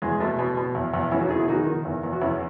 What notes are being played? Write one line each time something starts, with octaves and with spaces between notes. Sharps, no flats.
E2 G#3
B2 A3
B2
B2
E2
E2
E2 C#4 E4
D#4 F#4
B2 E4 G#4
E4 G#4
D#3 D#4 F#4
D#3
E2
E2
F#4
E2 C#4 E4